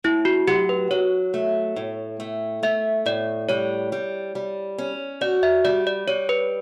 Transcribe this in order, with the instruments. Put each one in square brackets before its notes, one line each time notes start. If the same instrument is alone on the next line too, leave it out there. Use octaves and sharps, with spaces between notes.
[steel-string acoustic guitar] A2 [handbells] E4
[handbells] F#4
[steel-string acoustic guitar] F#3 [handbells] G4
[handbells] B4
[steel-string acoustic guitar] F#3 [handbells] C#5
[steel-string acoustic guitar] A3
A2
A3
[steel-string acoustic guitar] A3 [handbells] E5
[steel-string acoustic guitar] A2 [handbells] D5
[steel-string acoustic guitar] G3 [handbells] C#5
[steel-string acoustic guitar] G3
G3
C#4
[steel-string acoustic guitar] F#4 [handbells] D5
[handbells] E5
[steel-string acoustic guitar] G3 [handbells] D5
[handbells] D5
[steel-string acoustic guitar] G3 [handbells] C#5
[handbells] B4